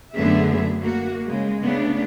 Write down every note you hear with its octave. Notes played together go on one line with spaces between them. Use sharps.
F#2 D3 A3 B3 G#4 E5
A#3 F#4
C#3 G#3
C#3 A3 B3 D4